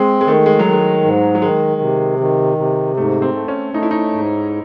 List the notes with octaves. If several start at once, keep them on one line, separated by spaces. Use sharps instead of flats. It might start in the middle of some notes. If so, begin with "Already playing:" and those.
Already playing: G#3 C4
G#3
D#3 A3
G#3
F#3
D#3
G#3
G#2
F#3
D#3 G#3
C3
D#3
C3
G#2 A3
C4
A3
C#4
A3 D#4
E4
D#4
G#2